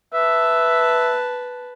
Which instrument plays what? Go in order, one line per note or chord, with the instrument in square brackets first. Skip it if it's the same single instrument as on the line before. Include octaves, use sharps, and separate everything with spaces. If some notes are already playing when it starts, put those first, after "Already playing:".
[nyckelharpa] B4 A5 [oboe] E5